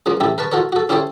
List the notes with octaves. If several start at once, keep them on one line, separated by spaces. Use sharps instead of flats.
C#3 F3 A#3
A1 E4 G4 A4
A#4 B4 A5 C#6
F4 F#4 A4 A#4 C#5
F#4 A4
C#4 E4 G4 A4 C5 C#5